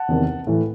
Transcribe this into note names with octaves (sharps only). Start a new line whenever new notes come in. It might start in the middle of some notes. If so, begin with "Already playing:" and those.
Already playing: F#5 A5
E2 C3 D#3
A2 E3